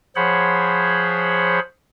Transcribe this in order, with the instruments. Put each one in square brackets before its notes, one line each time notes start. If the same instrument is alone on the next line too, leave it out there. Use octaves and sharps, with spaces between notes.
[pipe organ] F3 G#4 C5 C#5 F#5 B5